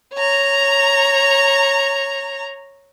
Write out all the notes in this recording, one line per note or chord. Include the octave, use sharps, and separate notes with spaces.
C#5 A#5